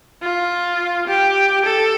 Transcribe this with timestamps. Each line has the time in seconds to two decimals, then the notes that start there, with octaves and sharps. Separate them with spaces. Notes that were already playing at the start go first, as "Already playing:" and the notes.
0.23 F4
1.08 G4
1.66 A4